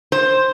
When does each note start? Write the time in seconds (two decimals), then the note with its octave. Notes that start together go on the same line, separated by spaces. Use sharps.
0.12 C5